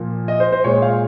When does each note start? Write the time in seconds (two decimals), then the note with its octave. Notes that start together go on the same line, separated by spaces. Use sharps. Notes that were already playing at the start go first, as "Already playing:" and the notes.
Already playing: A#2 F3 A#3
0.28 D#5
0.40 C5
0.52 C5
0.64 A#2 G#3 C#5
0.82 F5